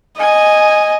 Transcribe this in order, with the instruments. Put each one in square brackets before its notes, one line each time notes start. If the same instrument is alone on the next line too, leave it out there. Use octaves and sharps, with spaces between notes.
[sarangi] D#5 [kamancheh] G#5